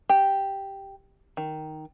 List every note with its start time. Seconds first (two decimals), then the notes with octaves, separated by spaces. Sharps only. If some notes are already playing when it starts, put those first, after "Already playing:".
0.09 G4
1.37 D#3